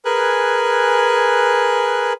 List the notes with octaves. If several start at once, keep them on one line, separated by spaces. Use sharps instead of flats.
G#4 A#4 B4 G#5 F#6